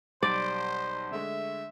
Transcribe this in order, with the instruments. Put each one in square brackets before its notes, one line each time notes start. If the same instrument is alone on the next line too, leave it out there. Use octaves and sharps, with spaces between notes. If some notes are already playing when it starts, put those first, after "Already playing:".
[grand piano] B1 G3 D7 [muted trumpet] C5 [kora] D5
[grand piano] D3 G#3 A3 [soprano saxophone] E5